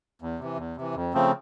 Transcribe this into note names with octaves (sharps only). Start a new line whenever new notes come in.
E2
C3 E3
E2
C3 E3
F2
C#3 F3 A3 C4